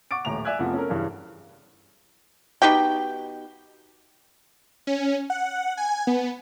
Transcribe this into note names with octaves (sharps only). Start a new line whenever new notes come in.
F#5 C#6 D6 A6 D7
D#1 A1 A#5 F7
D5 E5 G#5 E6 F#6 G#6
F1 F2 B3 F4 F#5
C#4 A4 A#4
G2 C#3 E3 G3 C#4
B2 D#4 G4 G5
C#4
F#5
G#5
B3